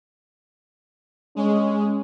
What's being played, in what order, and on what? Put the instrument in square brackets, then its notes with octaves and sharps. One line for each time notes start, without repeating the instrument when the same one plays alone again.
[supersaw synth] G#3 [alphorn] C#4